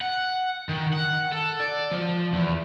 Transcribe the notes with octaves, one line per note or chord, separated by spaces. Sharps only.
F#5
D#3
F#5
A4
D5
F3
E2